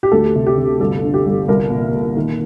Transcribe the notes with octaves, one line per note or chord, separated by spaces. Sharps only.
G4
D2 A4
C3
G4
C3
G1 A4
D3
G4
G1
C2 A#4
A#2
A#2
D#3